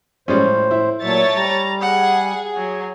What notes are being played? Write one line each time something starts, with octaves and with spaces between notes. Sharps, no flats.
A2 G3 G#3 C#4 C5
E4
A#2 F#3 A3 C#5 E5 A6
G3 A#5
G#4 F#5
F#3